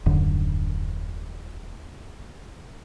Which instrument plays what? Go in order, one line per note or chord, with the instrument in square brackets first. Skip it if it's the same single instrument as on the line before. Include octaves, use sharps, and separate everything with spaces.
[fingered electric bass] D#1 F#2 D3